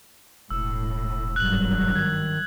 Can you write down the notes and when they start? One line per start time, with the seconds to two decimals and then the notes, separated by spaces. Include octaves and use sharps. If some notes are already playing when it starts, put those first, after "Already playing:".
0.50 E1 A2 E6
1.36 G#1 G2 F#3 F#6 F#7
1.95 D#3 G#6